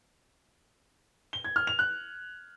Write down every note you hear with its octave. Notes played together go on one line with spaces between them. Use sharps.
G7
G#6
F6
F7
F#6